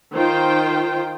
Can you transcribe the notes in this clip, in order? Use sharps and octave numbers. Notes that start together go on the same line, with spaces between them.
D#3 F4 C5 G5